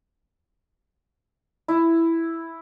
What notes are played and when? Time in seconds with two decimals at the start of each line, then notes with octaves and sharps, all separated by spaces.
1.68 E4